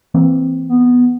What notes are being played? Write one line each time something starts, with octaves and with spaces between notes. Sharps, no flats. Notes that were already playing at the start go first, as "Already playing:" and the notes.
E3 A#3 C4
B3